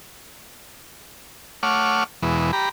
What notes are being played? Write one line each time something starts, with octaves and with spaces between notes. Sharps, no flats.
A3 C#5 F#5 D6 F6
E2 B2 E3 G#3
G4 A#5 B5